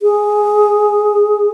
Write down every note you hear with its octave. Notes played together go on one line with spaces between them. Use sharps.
G#4